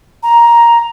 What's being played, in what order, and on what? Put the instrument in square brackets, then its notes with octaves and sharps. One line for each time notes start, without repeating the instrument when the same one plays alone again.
[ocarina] A#5